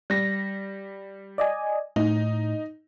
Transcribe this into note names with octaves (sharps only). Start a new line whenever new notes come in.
G3 A#6
D5 D#5 G#5
A2 D#4